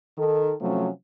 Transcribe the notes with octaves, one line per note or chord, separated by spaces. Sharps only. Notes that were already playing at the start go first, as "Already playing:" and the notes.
D#3 A4
C3 F3 F#3 A3 C#4